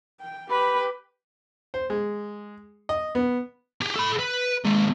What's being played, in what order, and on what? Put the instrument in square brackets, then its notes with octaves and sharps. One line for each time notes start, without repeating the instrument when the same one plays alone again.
[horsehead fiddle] G5
[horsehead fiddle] G4 [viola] B4 [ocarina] B5
[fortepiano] C5
G#3
D#5
B3
[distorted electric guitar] G4 G#4
A4 B5
B4
D#2 G#3